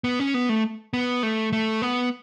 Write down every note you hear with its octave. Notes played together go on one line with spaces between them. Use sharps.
B3
C#4
B3
A3
B3
A3
A3
B3